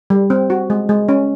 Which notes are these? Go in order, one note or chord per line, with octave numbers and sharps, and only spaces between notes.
G3
C4
F#4
G#3
G#3
C#4